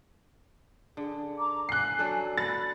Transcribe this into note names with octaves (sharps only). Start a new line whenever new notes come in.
D3 G#4
A#5 D6
G#5 F#6 C7
F#3 D4 A4
F#5 B5 A6